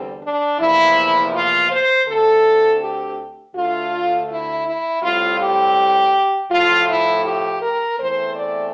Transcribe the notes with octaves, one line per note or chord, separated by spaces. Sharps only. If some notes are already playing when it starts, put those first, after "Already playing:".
Already playing: E2 D3 G3 C4
D4
E2 C3 F3 A#3 E4
F4
C5
D2 D3 A3 C4 A4
G4
D2 D3 A3 F4
E4
E4
A2 G3 C4 F4
G4
A2 F3 A3 F4
E4
G4
A#4
E2 E3 A3 C4 C5
D5